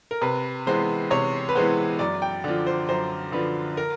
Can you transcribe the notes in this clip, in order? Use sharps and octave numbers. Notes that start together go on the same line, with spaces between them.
A#4
C3 B4
E3 G#3 B3 C5
C3 C#5
B4
E3 G#3 B3 C5
F#2 D5
G5
D3 F3
C5
F#2 C5
D3 F3 B4
A#4